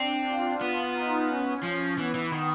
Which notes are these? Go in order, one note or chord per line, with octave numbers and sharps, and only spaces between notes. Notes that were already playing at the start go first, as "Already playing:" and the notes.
Already playing: C4 D4
F4
B3
D#4
C#4
F3
E3 B3
E3
D#3